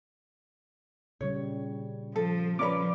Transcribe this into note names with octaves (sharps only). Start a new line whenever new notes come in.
A#2 C#3 G3 C#5
F3 A4
F3 C#4 A#4 B4 D5 D6